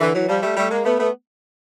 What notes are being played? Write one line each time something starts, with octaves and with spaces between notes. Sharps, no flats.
D3 E3
E3 F#3
F3 G3
G3 A3
G3 A3
G#3 A#3
A3 B3
A3 B3